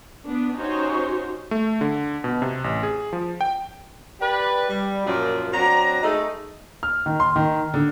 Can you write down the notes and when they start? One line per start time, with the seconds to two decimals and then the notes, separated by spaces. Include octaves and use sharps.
0.25 B3 D4
0.57 C#4 D#4 F#4 G4 C5 C#5
1.51 A3
1.81 D3
2.24 B2
2.42 C3
2.64 A1
2.83 G#4
3.13 F3
3.41 G5
4.21 G4 B4 D5
4.69 G3
5.06 F#2 A#2 F3
5.52 F#3 C4 D4 A#5
6.03 G#3 A3 D#4
6.83 F6
7.06 D#3
7.20 C6
7.36 D#3
7.74 D3